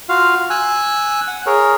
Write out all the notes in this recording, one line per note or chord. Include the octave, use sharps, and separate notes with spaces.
F4 F#4 F5
G#5 E6 F#6
F#5
G#4 A#4 C#5